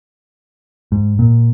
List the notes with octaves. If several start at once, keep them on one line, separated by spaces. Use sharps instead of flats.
G#2
A#2